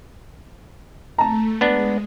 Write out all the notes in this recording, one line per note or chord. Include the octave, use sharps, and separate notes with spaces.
A3 A5 A#5
G#3 B3 D4